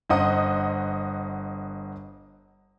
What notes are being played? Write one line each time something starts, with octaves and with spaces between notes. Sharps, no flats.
G1 C5 D#5 F#5 D#6